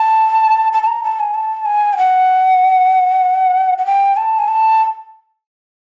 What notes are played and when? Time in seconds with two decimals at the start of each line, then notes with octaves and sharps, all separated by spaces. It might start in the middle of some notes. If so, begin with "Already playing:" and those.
Already playing: A5
0.73 A5
0.83 A5
0.87 A#5
1.03 A5
1.20 G#5
1.34 A5
1.66 G#5
1.93 G5
1.97 F#5
3.78 F#5
3.86 G5
4.17 A5
4.39 G#5
4.48 A5